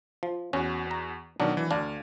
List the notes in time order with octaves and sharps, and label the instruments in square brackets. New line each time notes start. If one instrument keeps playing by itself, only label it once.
[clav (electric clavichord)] F3
[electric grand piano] E2 F#4 [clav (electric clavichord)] C#4
[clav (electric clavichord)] A#5
[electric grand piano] B2 D#3 [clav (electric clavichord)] F#3 D4
[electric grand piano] E3
[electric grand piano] D2 F5 [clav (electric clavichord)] D4